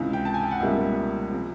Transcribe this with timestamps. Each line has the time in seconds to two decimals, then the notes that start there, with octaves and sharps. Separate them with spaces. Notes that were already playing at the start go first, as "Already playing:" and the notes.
Already playing: C#2 C3 E3
0.13 G5
0.25 A5
0.34 G#5
0.43 G5
0.52 F#5
0.60 C#2 B2 G3 A#3 E5
1.31 C3 F3